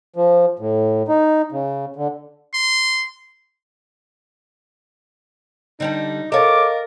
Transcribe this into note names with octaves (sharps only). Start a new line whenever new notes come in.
F3
A2
D#4
C#3
D3
C6
D3 G3 D4 D#4
A4 A#4 C#5 D#5 F5 D6 A6